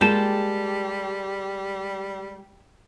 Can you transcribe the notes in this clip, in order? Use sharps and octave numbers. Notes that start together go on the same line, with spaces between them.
G3 G#3 A#3 F4 G4 A5